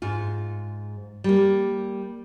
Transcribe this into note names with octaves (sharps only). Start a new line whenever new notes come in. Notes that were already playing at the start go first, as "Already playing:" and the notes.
G#2 F4
G3 A#3